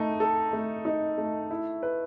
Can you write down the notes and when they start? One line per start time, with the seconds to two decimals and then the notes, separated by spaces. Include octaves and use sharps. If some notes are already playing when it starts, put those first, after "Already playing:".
Already playing: A3 D#4
0.20 A4
0.53 A3
0.85 D#4
1.18 A3
1.51 E4
1.83 B4